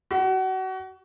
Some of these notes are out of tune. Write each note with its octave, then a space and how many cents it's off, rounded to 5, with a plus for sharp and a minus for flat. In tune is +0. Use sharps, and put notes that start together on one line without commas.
F#4 +30